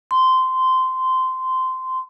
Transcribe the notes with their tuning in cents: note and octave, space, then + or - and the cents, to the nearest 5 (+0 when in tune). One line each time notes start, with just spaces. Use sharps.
C6 -15